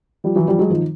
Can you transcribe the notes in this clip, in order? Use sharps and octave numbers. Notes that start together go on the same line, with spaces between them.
F3 G3
E3 F#3
F3 G3
F#3 G#3
D#3 F3